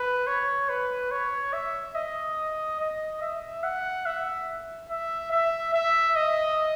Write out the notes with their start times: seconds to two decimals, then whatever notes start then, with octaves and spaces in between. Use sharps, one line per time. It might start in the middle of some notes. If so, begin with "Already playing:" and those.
Already playing: B4
0.27 C#5
0.69 B4
1.11 C#5
1.53 E5
1.95 D#5
2.80 D#5
3.22 E5
3.64 F#5
4.06 E5
4.90 E5
5.31 E5
5.74 E5
6.16 D#5